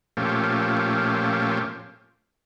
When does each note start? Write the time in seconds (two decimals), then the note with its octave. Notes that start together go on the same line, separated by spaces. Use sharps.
0.17 A#2 F3 A3 C#4 G4